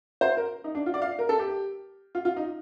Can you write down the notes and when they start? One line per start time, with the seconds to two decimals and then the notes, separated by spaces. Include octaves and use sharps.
0.21 C5
0.37 A#4
0.64 D#4
0.75 D4
0.86 F4
0.94 D5
1.02 F5
1.19 A#4
1.29 A4
1.39 G4
2.15 F4
2.25 F4
2.36 D#4